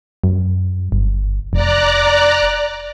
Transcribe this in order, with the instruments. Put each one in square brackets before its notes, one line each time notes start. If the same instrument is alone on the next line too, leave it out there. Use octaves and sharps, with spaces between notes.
[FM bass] F#2
G1
[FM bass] F1 [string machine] D5 A#5 F#6